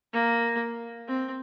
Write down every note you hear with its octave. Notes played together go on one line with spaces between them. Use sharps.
A#3
C4